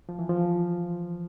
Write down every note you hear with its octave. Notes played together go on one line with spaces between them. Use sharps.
F3
E3
F3